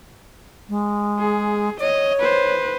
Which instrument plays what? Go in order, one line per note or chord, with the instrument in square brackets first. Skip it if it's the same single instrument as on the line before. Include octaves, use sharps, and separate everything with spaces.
[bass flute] G#3
[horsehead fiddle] G#4
[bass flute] C#5 [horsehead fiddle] D#5
[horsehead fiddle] B4 C5